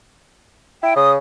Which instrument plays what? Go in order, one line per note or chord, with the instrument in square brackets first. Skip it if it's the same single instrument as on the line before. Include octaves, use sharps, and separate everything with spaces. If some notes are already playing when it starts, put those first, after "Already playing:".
[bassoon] E4 [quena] G5
[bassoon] C#3 [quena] D#6